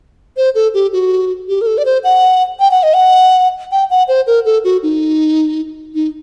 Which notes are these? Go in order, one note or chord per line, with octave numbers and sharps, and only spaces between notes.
C5
A4
G4
F#4
G4
A#4
A4
D5
C5
F#5
G5
F#5
D#5
F#5
G5
F#5
C5
A#4
A4
F#4
D#4
D#4